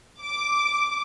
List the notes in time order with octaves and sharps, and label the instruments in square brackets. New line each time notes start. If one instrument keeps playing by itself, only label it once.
[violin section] D6